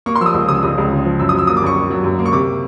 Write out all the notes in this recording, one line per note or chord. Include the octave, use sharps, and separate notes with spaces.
A#3 C#6
C6
F3 E6
D#6
C#2 E6
C#3 D#6
E6
C#2 D#6
C#2
C#3
F3
F#2 E6
D#6
F#3 E6
A#3 D#6
D6
F#2 C#6
A#3
F#3
F#2
A#3
C#6
C3 D6